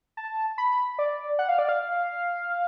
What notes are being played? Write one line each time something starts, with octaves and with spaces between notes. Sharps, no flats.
A5
B5
D5
F#5
F5
D5
F5